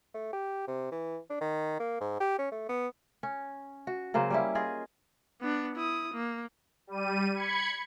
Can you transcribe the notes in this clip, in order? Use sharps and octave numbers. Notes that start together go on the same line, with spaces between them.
A3
G4
C3
E3
D4
D#3
A#3
G#2
G4
C#4
A3
B3
C#4
F#4
C#3 F#3 A#3 C5
G3 C#4 E4
F4 G#4 D#5
B3 D4
E4 D#6
A#3
G3 D#7
B5 G#6 C#7